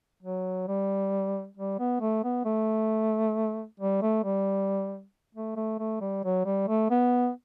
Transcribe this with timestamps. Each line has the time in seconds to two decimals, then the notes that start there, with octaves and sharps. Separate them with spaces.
0.23 F#3
0.68 G3
1.57 G3
1.79 B3
2.01 A3
2.24 B3
2.45 A3
3.80 G3
4.02 A3
4.24 G3
5.35 A3
5.56 A3
5.79 A3
6.01 G3
6.24 F#3
6.46 G3
6.68 A3
6.90 B3